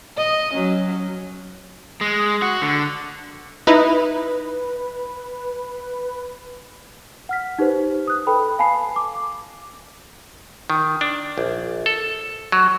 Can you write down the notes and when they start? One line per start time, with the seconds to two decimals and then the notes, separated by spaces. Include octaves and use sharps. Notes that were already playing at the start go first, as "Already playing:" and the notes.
0.17 D#5
0.54 F#3 C#4
2.01 G#3
2.42 F#4
2.62 D3
3.67 D#4 E4 B4
7.29 F#5 F6 B6
7.59 D#4 G4 B4 C5
8.07 D#6 F#6
8.27 A4 B4 G5 B5
8.59 F5 G#5 A5 B5 C7
8.96 D6
10.70 D#3
11.01 D4
11.38 A#1
11.86 A4
12.52 F#3